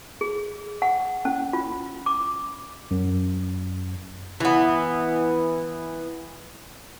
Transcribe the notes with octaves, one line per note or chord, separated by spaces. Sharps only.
G#4
F#5
C#4
F4
D6
F#2
E3 B3